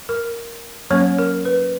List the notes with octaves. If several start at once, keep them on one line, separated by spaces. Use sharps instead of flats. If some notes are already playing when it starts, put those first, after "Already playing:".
A#4
F#3 A#3 C#4 C#5
A#4
B4